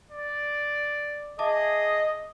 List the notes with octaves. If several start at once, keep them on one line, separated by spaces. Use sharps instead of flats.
D5
G#4 D#5 E5 A5 D6